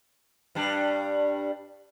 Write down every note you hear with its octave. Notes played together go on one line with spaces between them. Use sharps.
G2 G3 D4